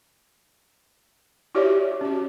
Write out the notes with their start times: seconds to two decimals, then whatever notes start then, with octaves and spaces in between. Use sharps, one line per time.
1.55 E4 F#4 G4 C#5 D5 E5
2.01 C#4 F#4